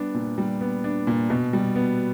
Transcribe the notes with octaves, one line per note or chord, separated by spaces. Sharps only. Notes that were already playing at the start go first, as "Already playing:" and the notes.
Already playing: G3 B3 D4
A#2
G3
B3
D4
A#2
B2
G3
B3